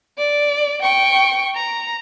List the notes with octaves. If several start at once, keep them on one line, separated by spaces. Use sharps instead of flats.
D5
G5 C#6
A#5